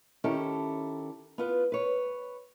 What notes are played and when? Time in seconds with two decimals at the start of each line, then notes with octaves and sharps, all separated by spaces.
0.24 D#3 C#4 E4 G4 A4
1.38 B3 F4 B4
1.72 B4 C#5